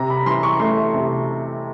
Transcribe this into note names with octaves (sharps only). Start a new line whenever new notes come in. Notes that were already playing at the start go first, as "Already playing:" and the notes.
Already playing: C3 A#5
B5
E3 C6
C#6
A3 C6
C3